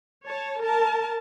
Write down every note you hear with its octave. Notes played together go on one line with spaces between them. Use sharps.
C#5 A5
A#4 A5